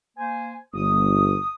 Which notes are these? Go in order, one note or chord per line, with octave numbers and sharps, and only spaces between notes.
A#3 C5 G#5
G1 D#6